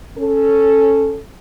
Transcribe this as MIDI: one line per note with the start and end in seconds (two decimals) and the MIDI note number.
0.16 1.18 61
0.16 1.18 69